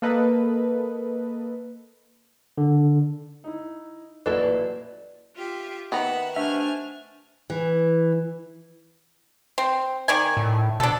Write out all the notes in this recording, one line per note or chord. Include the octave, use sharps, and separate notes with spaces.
A#3 A4 B4 D#5
D3
D#4 E4
A1 A#2 F#3 E4 A4 B4 D5 D#5
F4 G4 E5
D#3 B3 E5 F#5 A#5
C3 A3 D4 E5 G#5 F6
E3
C4
D#3 D5 G#5
A2
B2 D4 A4